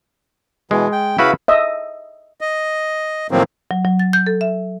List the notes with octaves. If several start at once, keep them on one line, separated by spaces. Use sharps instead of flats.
B2 E3 G#3
G5
C#3 E4 F#4 B4 F5 B5
D#5 E5
D#5
A2 D#3 F3 F#3 A#3 C4
F#3
F#3
A6
G6
A4
E5